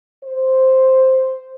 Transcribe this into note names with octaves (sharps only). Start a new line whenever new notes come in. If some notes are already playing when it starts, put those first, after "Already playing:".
C5